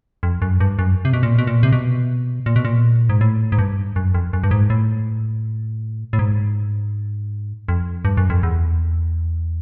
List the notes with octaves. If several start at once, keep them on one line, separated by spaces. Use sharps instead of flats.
F2
F#2
G2
F#2
C3
B2
A#2
B2
A#2
C3
B2
A#2
B2
A#2
G#2
A2
G#2
G2
F#2
F2
F#2
G2
G#2
A2
A2
G#2
F2
G2
F#2
F2
E2